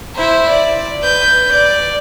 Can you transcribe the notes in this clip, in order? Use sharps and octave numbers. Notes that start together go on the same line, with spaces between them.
E4 C5
D5
B4 G6
D5